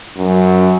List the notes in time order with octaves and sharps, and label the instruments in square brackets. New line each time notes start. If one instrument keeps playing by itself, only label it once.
[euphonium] F#2